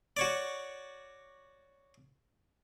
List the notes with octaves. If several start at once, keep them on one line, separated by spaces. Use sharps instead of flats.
F#4 C#5 D5